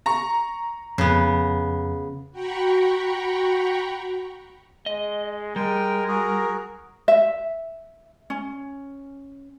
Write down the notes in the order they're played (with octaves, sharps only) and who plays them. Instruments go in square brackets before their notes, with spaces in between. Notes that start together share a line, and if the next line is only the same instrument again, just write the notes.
[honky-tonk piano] A#5 C#6
[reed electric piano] F2 [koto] C#3 B3
[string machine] F#4 G5 A#5 B5 C#6
[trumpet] G#3 [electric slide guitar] D#5
[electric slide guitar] G3 [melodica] G#3 G5 G#5 [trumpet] A#4
[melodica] F#4 G#4
[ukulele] E5
C#4